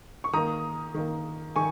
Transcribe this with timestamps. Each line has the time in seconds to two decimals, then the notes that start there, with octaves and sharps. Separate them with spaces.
0.24 C#6
0.33 D#3 A#3 A#5 D#6
0.94 D#3 A#3
1.56 D#3 G#5 C#6